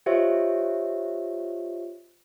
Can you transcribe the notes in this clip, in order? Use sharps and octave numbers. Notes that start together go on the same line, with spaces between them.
F4 G4 C5 C#5 D#5 E5